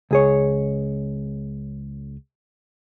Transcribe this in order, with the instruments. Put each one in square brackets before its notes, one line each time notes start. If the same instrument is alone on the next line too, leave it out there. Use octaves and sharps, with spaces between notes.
[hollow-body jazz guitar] C#2 G#4 C#5